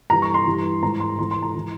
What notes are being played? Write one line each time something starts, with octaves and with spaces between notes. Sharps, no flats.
G2 E3 A#5
C#6
C6
G2 E3
G#2 E3 A#5
C6
G#2 E3 C6
C6
A#5
E3